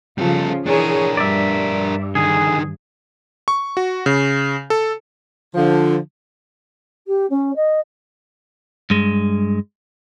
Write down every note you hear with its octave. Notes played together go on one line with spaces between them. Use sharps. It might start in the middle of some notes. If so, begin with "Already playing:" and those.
C#3 F3 G3 F4 A4
E3 D4 G#4 A#4 C#5
G2 D5 E5
D3 D#3 G#4
C#6
F#4
C#3
A4
D3 F3
G4
C#4
D#5
G2 G#3